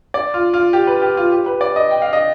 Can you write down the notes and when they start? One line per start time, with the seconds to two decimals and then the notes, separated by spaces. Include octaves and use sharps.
0.14 D5
0.34 F4
0.54 F4
0.73 G4
0.87 B4
1.02 G4
1.17 F4
1.32 G4
1.46 B4
1.61 D5
1.76 D#5
1.91 G5
2.02 F5
2.13 D#5